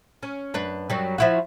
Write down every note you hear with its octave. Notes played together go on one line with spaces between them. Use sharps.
C#4
F#2 D4 B4
F#2 F#3 G3
F3 E4 F#4